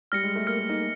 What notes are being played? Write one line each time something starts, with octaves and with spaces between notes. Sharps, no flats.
G3 F6 A#6 C#7
G#3
A3
A#3 F6 A#6 C#7
A#3
D#4